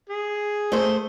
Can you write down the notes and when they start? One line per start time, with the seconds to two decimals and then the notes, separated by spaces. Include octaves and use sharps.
0.09 G#4
0.72 A3 C5